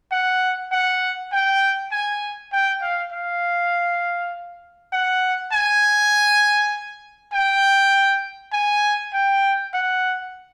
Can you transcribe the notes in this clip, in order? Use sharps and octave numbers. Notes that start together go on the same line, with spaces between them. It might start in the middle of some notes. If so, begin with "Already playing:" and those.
F#5
F#5
G5
G#5
G5
F5
F5
F#5
G#5
G5
G#5
G5
F#5